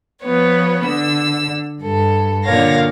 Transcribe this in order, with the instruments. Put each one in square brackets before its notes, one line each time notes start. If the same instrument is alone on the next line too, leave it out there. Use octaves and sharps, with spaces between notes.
[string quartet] F3 B3 B4 C#5
D3 E6
G2 A4
A#2 D3 A#4 C#5 F5 A#6